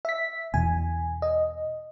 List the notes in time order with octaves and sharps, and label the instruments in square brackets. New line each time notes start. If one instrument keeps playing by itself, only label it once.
[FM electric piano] E5 B6
[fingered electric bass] E2 B2 [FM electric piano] G#5
[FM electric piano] D#5